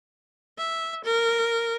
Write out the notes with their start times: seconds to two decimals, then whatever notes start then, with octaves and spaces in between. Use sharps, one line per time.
0.58 E5
1.04 A#4